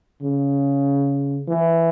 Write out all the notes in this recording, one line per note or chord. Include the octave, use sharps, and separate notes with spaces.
C#3
E3